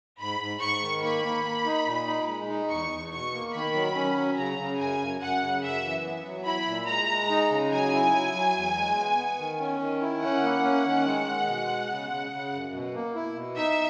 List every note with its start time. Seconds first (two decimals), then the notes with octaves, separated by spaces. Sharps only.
0.19 G#2 B5
0.40 G#2
0.61 G#2 C#6
0.82 D#3
1.02 A#3 B5
1.24 A#3
1.44 A#3
1.66 D#4
1.86 A#2
2.07 D#4
2.28 G#3
2.49 D#4
2.70 E2 C#6
2.91 E2
3.12 B2 C#6
3.33 A#3
3.54 D#3 B5
3.75 F#3
3.96 C#4
4.17 F#3
4.37 C#3 A#5
4.58 C#3
4.79 F#2 G#5
5.00 F#2
5.21 F#2 F#5
5.42 C#3
5.63 F#2 E5
5.84 E3
6.05 B3
6.26 F#3
6.46 E4 B5
6.67 A#2
6.88 G#3 A#5
7.09 G#3
7.29 D#4
7.50 C#3
7.72 F#3 G#5
7.93 E4
8.13 F#3
8.34 F#3
8.55 E2
8.76 G#3
8.97 B3
9.18 B3
9.39 D#3
9.60 C#4
9.80 D#3
10.02 E4
10.22 C#4 F#5
10.43 A#3
10.64 C#4
10.85 D#3
11.06 G#3
11.27 G#3
11.47 B2
11.69 G#3
11.90 C#3
12.10 C#3
12.31 C#3
12.52 F#2
12.73 B2
12.94 A#3
13.15 E4
13.36 B2
13.56 D#4 E5